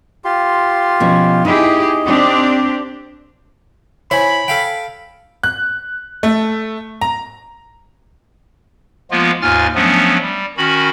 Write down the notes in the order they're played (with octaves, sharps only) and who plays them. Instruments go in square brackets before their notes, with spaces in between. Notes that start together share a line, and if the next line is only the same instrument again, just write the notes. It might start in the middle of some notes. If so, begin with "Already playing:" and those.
[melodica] F4 G4 C6
[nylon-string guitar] B2 F3 C#4
[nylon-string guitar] D#4 [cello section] E4 G4 G#4 [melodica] D#5
[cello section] C4 D4 G4
[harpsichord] E4 C5 [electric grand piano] C#5 G#5 [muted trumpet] B5
[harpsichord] A4 F5 G5
[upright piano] F#6
A3
A#5
[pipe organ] F3 G#3 A#3 B3 F4
D#2 G#2 F4 G#5 F6 A6
F3 F#3 A3 B3 C#4 D4
G3
D#3 C#4 F#4 B5